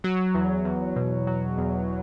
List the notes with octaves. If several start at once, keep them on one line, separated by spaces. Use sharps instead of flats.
F#3
E2
E2
B2
F#3
E2